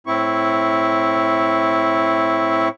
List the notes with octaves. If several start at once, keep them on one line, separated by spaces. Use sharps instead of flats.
A2 C4 E4 C#6